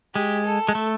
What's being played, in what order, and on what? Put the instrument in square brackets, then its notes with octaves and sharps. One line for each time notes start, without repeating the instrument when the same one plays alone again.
[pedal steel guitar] G#3 [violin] G4
[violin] A4
[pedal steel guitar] G#3
A3